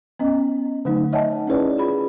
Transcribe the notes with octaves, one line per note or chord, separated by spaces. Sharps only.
B3 C#4 D#5
D3 F#3 A3 D#4
C#5 D#5 E5 F#5 G#5 A5
C#4 E4 G#4 B4 C#5 D5
F4 G#4 B5